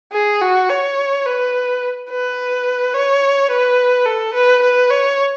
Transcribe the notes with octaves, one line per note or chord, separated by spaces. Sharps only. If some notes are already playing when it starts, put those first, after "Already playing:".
G#4
F#4
C#5
B4
B4
C#5
B4
A4
B4
B4
C#5